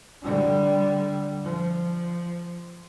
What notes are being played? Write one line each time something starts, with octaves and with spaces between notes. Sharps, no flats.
D3 G3
F3